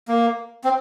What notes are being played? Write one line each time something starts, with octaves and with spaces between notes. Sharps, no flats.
A#3
C4